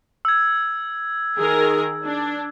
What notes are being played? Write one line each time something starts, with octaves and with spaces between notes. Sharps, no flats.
E6 G#6
D#3 G#4 A#4
D4